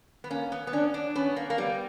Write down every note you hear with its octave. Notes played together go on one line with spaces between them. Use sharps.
B3
A#3 C#4
B3
B3
C#4 D4
D4
B3 C#4
A#3
A#3
G3 B3